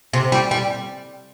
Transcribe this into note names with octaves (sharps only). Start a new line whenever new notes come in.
C3
G3
G3